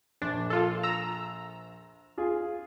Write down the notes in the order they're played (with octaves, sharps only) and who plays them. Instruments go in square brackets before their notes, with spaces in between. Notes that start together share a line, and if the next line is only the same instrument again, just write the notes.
[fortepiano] A#1 [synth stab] D4
[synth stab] F4 A4
A#5 E6
[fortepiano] F4 G#4